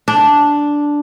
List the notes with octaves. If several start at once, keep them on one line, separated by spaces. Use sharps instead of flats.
D4